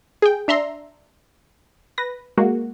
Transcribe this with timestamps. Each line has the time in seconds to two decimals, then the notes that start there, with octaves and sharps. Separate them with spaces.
0.22 G#4 G5
0.48 D4 E5 A#5 C6
1.98 B4 A#6
2.37 G#3 A#3 F#4